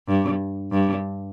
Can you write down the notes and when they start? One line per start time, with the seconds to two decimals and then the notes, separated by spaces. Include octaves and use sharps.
0.08 G2
0.72 G2